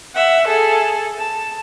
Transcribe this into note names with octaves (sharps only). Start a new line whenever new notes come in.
E5 F#5
G#4 A4
A5